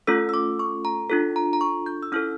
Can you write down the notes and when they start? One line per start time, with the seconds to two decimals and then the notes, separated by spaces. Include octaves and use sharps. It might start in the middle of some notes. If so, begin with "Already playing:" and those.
0.07 A3 C#4 F4 A4 E6
0.29 E6
0.34 D6
0.59 C#6
0.85 A#5
1.09 D4 F4 A4
1.36 A#5
1.53 A#5
1.61 C#6
1.86 G6
2.03 E6
2.12 C#4 E4 A4 F6